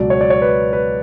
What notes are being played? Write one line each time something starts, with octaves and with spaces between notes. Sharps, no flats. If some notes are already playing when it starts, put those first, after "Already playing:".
Already playing: C#2 B2 F#3 D5
C#5
D5
C#5
B4
B4